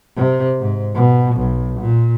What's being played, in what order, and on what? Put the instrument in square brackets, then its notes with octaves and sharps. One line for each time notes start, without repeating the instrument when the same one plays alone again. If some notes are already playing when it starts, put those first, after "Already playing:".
[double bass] C3
G#2
B2
B1
A#2